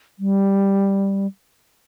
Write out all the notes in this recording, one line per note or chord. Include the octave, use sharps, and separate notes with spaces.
G3